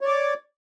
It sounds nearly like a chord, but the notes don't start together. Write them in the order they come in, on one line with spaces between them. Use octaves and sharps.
C#5 D5 D6